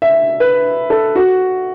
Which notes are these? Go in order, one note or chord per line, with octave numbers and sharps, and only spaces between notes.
E5
B4
A4
F#4